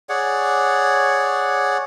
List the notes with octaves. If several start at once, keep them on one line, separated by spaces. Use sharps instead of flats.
G#4 C#5 D5 F#5